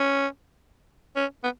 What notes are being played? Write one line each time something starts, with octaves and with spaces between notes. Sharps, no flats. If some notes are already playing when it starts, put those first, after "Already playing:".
Already playing: C#4
C#4
B3